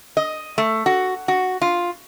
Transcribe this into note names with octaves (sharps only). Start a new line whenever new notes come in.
D#5
A3
F#4
F#4
F4